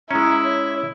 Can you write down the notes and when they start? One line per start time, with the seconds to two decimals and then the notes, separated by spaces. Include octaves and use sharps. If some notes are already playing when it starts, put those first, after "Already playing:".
0.11 G#3 C#4 E4 A#5
0.44 C#5